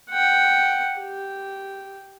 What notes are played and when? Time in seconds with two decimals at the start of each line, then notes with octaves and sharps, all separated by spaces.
0.11 F#5 G5
0.99 G4